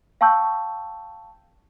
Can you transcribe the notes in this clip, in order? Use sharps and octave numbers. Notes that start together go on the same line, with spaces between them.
F5 G5 A5 C#6 E6 G6